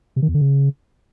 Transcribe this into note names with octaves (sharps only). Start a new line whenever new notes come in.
C3
D#3
E2
D3
C#3